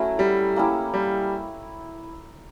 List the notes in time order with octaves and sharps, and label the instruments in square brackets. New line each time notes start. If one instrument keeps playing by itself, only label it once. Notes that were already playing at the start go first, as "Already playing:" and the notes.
Already playing: [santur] F#3 A3 C#4 E4
[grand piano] G3
[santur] A#3 C#4 E4 G4
[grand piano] G3